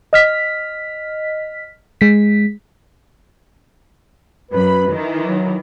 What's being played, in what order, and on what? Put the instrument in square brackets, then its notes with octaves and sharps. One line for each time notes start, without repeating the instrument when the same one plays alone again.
[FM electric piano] D#5 F6 B6
G#3 B6
[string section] F#2 B5 [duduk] B4
[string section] D#3 E3
[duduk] F#3